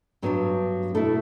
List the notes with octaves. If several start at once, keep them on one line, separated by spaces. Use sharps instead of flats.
G2 F#3 B3 D4
B2 A3 E4 A4